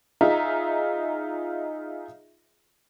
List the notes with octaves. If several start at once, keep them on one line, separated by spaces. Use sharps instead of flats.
D#4 F4 G#4 E5 A#5